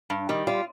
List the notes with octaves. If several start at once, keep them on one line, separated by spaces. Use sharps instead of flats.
G2
D#3 G3
G3 F4